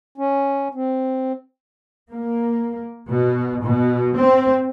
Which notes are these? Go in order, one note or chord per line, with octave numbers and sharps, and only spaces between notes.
C#4
C4
A#3
B2
B2
C4